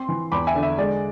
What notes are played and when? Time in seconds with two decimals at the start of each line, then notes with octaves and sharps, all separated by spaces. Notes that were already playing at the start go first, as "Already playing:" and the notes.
Already playing: C4 C6
0.09 E3
0.32 E2 B5 D6
0.47 E5 G#5
0.55 D3
0.63 E5
0.78 G#3 D5